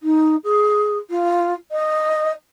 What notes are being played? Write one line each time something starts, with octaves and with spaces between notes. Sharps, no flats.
D#4
G#4
F4
D#5